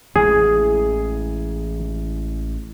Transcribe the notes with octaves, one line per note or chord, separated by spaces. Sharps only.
A1 E3 G#3 G#4